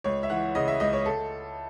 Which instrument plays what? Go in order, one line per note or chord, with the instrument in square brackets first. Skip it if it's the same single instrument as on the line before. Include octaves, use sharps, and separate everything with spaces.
[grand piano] C#2 C#5
E5
E3 F#5
C#3 D#5
E5
C#2 D#5
C#5
A4